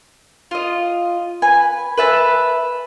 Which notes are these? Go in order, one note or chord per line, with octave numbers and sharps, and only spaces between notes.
F4 D#5
B4 G#5
B4 E5 A5